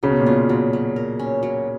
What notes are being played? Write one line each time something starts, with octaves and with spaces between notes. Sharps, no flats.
C#3 F#3
B2
A#2
B2 F4
F#3
F#3
A#4
C#4
F#3